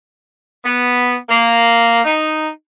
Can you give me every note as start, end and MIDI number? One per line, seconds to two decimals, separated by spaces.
0.65 1.15 59
1.29 2.00 58
2.05 2.48 63